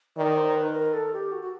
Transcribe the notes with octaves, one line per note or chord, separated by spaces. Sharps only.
D#3 D5
C5
B4
A#4
A4
G4
F#4
F#4